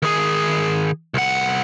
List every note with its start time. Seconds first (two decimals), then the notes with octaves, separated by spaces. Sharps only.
0.02 D#3 G#4
1.14 C2 F#5